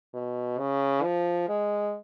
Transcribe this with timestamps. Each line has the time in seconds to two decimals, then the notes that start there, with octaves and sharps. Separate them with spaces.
0.14 B2
0.59 C#3
1.03 F3
1.48 G#3